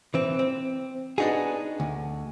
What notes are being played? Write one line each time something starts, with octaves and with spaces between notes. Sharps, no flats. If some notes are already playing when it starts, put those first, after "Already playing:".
E3 C4
C4
B3 D4 D#4 F#4 G#4
D2